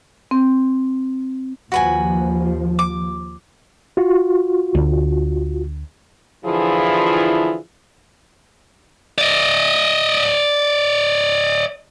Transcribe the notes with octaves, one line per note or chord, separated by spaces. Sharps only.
C4
D#2 F3 F#4 B4 G#5
D6
F4 F#4
D2
D3 E3 F3 E4 F4 G#4
D5 D#5